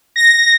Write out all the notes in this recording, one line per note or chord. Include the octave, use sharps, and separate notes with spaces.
A#6